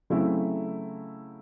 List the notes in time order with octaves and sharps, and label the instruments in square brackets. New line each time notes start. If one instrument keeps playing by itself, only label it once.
[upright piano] C#3 F#3 A3 C4 E4